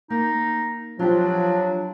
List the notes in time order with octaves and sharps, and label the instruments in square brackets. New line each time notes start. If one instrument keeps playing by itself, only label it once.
[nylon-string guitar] A#3 [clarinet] D#4
[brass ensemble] F3 [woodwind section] F#3 [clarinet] D4 [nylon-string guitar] F4 G4